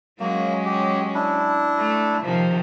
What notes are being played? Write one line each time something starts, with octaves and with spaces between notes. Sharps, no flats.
F#3 G#3 A#3 C#4
G4
D4 E4
A3
C3 D#3 F3